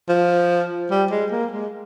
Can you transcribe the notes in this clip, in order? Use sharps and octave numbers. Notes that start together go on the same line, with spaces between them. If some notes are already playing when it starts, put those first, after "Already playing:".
F3
G3
G#3
A#3
G#3